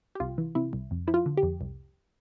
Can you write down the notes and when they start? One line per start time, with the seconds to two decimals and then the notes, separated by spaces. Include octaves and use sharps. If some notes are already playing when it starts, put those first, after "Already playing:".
0.15 G4
0.20 C2 F4
0.38 E3
0.55 C3 E4
0.73 C2
0.91 F2
1.07 F3 E4
1.14 F4
1.26 D3
1.37 G4
1.43 F2
1.61 C2